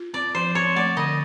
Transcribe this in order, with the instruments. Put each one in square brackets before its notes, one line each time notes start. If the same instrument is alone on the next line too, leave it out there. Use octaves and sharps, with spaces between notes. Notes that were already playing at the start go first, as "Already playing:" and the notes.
Already playing: [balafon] F4
[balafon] C4 [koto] D5
[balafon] F3 [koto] C5
[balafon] C4 [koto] C#5
[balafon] A3 [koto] D5
[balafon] D3 [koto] D#5